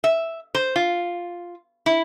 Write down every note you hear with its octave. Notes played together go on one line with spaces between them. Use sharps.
E5
C5
F4
E4